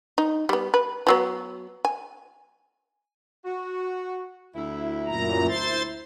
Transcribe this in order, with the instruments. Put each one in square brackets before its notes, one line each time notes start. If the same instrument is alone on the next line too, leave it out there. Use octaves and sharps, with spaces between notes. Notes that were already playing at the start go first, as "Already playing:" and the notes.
[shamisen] D#4
G3 B3
B4
F3 F#3 B3
G#5
[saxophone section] F#4
D2 E4
[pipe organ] F#2 A#2 A#5
C5 C6 A6